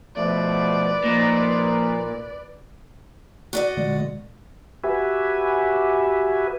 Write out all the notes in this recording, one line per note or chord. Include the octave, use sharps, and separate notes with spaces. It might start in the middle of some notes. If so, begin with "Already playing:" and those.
B2 F3 A3 B4 D5
A#2 F3 D#4
F#4 D5 D#5
A#2 D3 G#3
F#4 G4 B4 E5 G#5